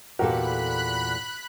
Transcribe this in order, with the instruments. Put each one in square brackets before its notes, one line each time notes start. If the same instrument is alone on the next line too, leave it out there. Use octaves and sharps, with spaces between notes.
[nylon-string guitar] E2 A#2 A4 [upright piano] F#4 G4 A#4 [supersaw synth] B5 F#6